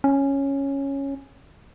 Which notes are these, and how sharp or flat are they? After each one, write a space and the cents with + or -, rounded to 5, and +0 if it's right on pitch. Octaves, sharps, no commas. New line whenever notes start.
C#4 -5